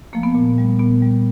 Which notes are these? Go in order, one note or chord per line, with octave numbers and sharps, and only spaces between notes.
F3 A3 A#3
B3
A#2
G3
A#2 B3
G3